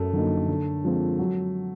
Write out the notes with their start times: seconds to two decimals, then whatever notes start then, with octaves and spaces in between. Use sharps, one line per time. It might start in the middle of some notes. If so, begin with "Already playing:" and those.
Already playing: F#2 A3
0.13 D3 F#3 A#3 D#4
0.48 D3
0.84 F3 G#3 C4
1.18 F#3